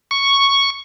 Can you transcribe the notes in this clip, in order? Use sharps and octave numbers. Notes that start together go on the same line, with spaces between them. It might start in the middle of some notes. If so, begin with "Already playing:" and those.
C#6